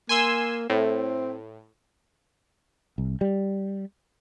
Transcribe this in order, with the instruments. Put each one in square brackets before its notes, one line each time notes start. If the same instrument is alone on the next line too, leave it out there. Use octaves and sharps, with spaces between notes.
[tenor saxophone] A#3 [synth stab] G#5 C6 E6
[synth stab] A2 [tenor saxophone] C4
[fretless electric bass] C2
G3